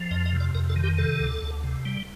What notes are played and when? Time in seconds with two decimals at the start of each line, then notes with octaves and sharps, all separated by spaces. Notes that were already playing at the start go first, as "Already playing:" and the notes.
Already playing: F3
0.11 F2 D#5
0.26 D#5
0.33 C3
0.40 D5
0.55 F2 A#4
0.69 A4
0.76 D#3
0.83 G4
0.98 C3 A4
1.20 D2
1.42 D2
1.64 C3
1.85 G3